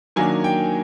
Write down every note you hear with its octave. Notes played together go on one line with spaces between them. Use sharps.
D#3 F#3 A#3 D4 G#5
G5